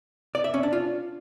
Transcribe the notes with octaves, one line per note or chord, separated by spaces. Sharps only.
D5
E5
C#4
D4
F4